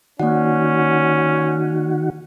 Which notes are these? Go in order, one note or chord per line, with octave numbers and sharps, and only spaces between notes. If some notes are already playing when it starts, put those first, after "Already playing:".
D#3 A#3 C#4 F#4 D5 F#5